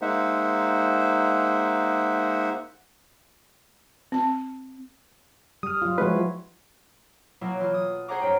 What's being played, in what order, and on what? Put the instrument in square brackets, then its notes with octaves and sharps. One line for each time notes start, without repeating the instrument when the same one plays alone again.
[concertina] G#3 A#3 D#4 C5 E5 F#5
[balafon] C4 A5
[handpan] G3 [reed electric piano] D#6 F6
[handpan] F#3 F4
[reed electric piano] F3 G#3 B4 [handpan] E4 F#4 C#5
[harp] B2 F#3 A#3 E4
E3 F4
D#6
G#4 C5 C#5 F#5 A#5 D6
F#2 D#4 G5